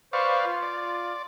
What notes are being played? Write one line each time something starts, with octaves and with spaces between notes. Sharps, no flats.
B4 C5 D5 F5 C#6
F4
D5